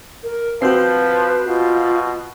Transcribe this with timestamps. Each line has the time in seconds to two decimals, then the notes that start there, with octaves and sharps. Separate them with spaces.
0.23 A#4
0.62 F3 C4 F#4 B4 G6 C7
1.47 B2 F4